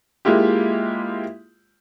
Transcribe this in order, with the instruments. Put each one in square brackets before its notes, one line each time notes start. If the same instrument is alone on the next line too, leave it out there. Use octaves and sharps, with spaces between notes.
[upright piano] G#3 A#3 E4 F4 G4